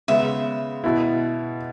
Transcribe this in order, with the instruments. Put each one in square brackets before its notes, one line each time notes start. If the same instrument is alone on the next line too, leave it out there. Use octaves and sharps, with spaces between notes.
[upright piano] C#3 G#3 B3 [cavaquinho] E5
[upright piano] B2 B3 E4